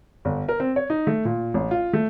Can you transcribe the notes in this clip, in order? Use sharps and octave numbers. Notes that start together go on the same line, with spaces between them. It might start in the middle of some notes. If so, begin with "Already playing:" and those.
G1
A#4
C4
C#5
D#4
A3
A#2
A1
F4
A3